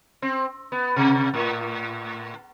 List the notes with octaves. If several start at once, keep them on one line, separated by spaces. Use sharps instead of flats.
C4
B3
C3
A2